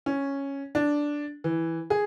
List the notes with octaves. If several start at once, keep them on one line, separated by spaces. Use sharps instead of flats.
C#4
D4
E3
G#4